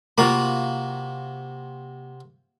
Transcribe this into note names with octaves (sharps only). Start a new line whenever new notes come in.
C3 A#3 F4 F#4 B5